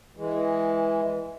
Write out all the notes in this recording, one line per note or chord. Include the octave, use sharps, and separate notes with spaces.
E3 G#3